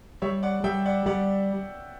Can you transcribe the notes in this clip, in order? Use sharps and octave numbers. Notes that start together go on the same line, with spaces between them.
G3 C#5 E5
D5 F#5
G3 E5 G5
D5 F#5
G3 D5 F#5